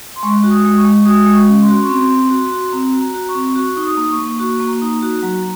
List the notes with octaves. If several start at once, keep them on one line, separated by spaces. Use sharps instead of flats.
C6
G#3 C#6
F#4
D#6
G#3
C#6
G#3
F#4 D#6
G#3
C#6
C#4
C6
F#4
C#6
C4 C6
C4
F#4
F#4
C4 A#5
F#4
A#5
F#4
C#6
C4
F#4 C#6
D#4
D#6
A#3
C#6
A#3
F#4 C#6
A#3
A#5
D#4
F#4
F#3 A#5